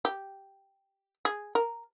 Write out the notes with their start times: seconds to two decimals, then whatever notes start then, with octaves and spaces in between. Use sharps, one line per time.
0.05 G4
1.25 G#4
1.55 A#4